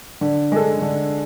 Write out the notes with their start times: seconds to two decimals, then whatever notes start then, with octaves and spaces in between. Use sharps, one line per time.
0.21 D3
0.52 G#3 D4 A4
0.82 D3